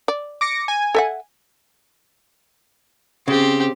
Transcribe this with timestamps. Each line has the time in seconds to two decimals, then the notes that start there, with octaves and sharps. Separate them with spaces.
0.08 D5
0.41 D6 A#6 C#7
0.68 G#5
0.95 A4 E5 F#5
3.28 C#3 C4 G4